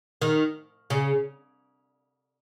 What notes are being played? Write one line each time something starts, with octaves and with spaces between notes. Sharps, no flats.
D#3
C#3